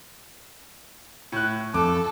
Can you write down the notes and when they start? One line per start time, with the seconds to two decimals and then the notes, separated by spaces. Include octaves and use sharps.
1.32 A2 F#6
1.74 F2 A4 D6